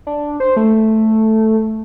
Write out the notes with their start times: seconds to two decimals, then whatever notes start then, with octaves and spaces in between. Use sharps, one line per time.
0.07 D4
0.40 C5
0.57 A3